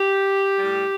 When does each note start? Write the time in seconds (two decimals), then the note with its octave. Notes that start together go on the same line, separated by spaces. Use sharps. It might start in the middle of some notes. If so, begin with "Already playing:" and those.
Already playing: G4
0.58 A2 G3